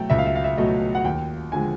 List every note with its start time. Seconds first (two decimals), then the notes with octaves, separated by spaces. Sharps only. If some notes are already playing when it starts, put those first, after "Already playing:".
Already playing: B2 F#3 A3 G5
0.10 C#2 E5
0.19 F5
0.27 E5
0.36 F5
0.44 E5
0.58 B2 F#3 A3 D#5
0.95 F#5
1.05 D#2 G5
1.52 D3 F3 G#3 G#5